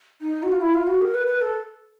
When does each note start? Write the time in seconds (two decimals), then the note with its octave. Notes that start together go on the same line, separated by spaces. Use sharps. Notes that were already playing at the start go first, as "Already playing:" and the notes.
0.21 D#4
0.43 F#4
0.52 F4
0.61 E4
0.74 F4
0.87 F#4
1.01 A#4
1.14 B4
1.27 B4
1.41 A4